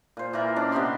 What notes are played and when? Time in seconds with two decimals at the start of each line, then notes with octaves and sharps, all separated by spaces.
0.17 A#2 C5
0.33 A#2 E3 A#4 D5
0.56 D#3 C#4 D4
0.72 C3 B3 G4 C6